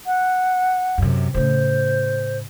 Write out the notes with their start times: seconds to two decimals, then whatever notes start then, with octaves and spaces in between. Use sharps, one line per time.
0.06 F#5
0.98 F#2 C3
1.34 A2 C#3 C5